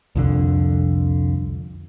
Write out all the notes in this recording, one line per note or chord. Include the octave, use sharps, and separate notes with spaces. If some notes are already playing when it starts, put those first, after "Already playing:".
C2 F2 D3